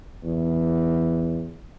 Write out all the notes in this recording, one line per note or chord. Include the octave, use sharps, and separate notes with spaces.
E2